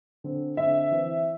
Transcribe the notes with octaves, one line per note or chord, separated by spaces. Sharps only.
D3 C4
D3 C4 E5
E3 C4